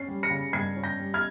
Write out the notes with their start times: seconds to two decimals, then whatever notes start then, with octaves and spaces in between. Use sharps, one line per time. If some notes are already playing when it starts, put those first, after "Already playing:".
Already playing: C#4 C7
0.08 G3
0.23 A#6 C#7
0.31 C#3
0.53 G2 G#6 C7
0.76 C#4
0.84 G6 A#6
0.99 G3
1.14 F6 G#6